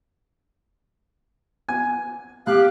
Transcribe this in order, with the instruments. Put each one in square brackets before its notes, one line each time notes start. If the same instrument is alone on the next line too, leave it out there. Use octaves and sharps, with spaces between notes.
[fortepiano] G#5
[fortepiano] A2 [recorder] G4 [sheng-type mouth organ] F5 F#6